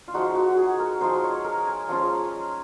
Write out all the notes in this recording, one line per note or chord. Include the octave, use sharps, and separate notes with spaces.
F4
F3 G#3 D#4 F#4
F#4
G#4
A#4
F3 G#3 D#4 C5
C#5
A#4
G#5
F3 G#3 C#4 F4 A#5